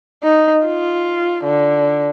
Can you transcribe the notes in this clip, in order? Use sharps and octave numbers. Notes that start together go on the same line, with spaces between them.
D#4
F4
D3